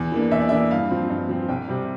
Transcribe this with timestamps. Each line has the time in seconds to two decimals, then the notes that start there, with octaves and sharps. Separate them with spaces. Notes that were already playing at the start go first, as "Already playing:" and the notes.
Already playing: E2
0.12 E3 A#3 D4
0.31 E2 E5
0.40 D5
0.49 E3 A#3 D4 E5
0.71 G2 F5
0.91 F3 C4
1.10 G2
1.29 F3 C4
1.49 C2 G5
1.68 C3 G3